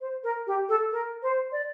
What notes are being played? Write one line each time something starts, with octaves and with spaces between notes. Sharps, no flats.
C5
A#4
G4
A4
A#4
C5
D5